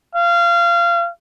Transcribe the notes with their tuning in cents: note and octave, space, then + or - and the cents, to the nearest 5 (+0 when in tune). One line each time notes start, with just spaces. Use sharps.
F5 -25